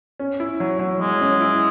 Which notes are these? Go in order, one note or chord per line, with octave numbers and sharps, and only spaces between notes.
C#4
E4
F#3
F#3
F#3 G#3
C#4
E4